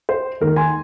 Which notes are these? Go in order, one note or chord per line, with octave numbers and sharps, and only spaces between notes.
C5
D#2 D#3 G#3 A#4
G#5 C6